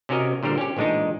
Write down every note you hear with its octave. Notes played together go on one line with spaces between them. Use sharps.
C3 C#4 F#4 A#4 D#5
A#2 D3 G3 A#4 C5
C#4 G4
A1 A#2 G#3 D4 D#4